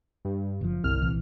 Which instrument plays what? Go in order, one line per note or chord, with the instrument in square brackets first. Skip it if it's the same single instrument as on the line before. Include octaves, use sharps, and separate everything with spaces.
[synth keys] G2
[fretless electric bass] F#1 A#2 F3
[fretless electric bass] G1 [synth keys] C2 F6
[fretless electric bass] A#1 E3